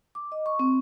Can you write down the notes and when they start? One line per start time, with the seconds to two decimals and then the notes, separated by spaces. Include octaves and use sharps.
0.15 D6
0.32 D#5
0.46 C#6
0.59 C4